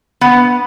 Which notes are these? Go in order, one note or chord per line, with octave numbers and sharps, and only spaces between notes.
B3